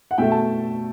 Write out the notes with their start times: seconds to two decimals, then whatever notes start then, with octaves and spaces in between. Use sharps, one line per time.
0.11 F#5
0.18 B2 A3 E5 G5
0.32 A5